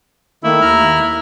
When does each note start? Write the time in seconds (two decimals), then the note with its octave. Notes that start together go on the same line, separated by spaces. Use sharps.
0.44 D#3 A3 A#3 E4
0.62 D#2 A#5 F6